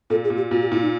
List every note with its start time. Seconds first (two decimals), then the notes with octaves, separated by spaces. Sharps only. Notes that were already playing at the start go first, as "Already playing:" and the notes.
0.10 A#2 A4
0.24 G#4
0.30 A#2
0.37 G4
0.51 A#2 F#4
0.62 G4
0.71 A#2 E4
0.82 D#4